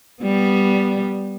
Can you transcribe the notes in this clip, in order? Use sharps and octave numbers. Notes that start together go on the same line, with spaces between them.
G3 B3